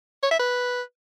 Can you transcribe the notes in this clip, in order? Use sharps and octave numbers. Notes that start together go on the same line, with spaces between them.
C#5
E5
B4